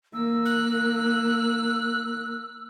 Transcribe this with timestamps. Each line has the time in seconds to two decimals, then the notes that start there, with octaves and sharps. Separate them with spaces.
0.14 A#3 E6
0.45 F#6